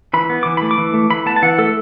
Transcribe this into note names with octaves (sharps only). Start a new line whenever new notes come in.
E3 B5
B3
E3 D6
A3 B5
D6
E3
A3
E3 B5
B3 A5
A5
E3 F#5
A3 A4